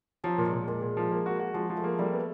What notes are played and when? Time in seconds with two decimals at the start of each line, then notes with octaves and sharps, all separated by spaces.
0.24 F3 F#3
0.38 A#2
0.45 G#3
0.53 A#2
0.68 A#2 G#3
0.82 A#2
0.97 F3
1.11 A#3
1.26 F#4
1.40 F#4
1.54 F3 G#3
1.70 F3
1.77 A3
1.84 A#3
1.98 G3 A3
2.13 B3